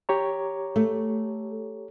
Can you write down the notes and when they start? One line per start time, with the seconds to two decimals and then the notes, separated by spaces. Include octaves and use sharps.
0.09 G4 C#5 A#5
0.76 A3